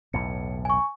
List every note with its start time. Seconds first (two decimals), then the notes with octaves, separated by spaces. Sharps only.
0.13 B1 E2 A2 C#7
0.65 G#5 C#6